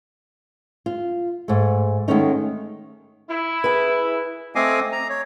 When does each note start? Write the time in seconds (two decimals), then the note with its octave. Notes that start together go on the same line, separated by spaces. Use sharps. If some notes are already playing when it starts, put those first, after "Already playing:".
0.86 F4
1.48 G#2 A3
2.08 D#3 G#3 A3 B3 C#4 D#4
3.30 E4
3.64 G#4 B4
4.55 A3 C4 D#5 F5 G#5 D6
4.92 A#5
5.09 C#5